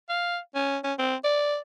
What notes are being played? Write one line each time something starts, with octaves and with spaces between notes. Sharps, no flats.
F5
C#4
C#4
C4
D5